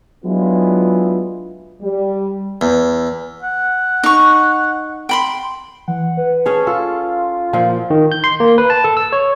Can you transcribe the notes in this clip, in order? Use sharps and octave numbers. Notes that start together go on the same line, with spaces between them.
F#3 G#3 B3 D4 E4 F4
G3
E2
F#5
D#4 C#6
G5 B5 C6
E3 F#5
B4
C#4 G#4 C#5 A5
F4 A4 F5
A#2 F3 D5
D#3
G6
C6
A#3
B4
A5
A4
E6
C#5